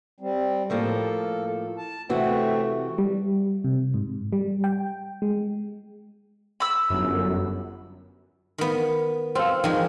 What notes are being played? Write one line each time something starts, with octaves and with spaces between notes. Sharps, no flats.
G3 C4
A2 F3 A#3 A4
A5
C3 E3 A3 C4 F#4
G3
C3
G#2
G3
G5
G#3
B5 E6
G1 F#2
D#3 B3
C4 F4 A4
D#3 F3 G#3